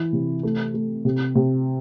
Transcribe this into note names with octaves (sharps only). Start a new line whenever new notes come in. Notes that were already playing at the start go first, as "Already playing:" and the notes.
Already playing: E3 E4
C3
A3
A3
C3
C3